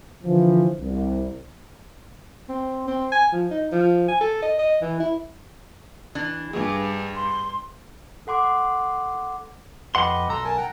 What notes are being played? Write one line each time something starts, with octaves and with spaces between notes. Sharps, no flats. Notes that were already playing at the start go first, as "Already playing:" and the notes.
D3 E3 F3
C2
C4
C4
G#5
F3
D#4
F3
G#5
A4
D#5
D#5
E3
E4
E3 D4
G2 G#4
C6
A4 F#5 C6 D6
F2 G4 B4 D#5 F#5 C6
B1 A4 A#5 C6 E6
A#4 G#5 A5
F#5 G5 A#5